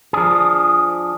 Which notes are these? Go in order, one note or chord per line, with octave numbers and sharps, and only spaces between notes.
F3 D4 G#4